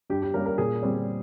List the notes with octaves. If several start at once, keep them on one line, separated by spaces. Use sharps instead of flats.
G2 G4
G4
G3 A#3 C#4 A#4
A#4
A#2 G#4
G3 C4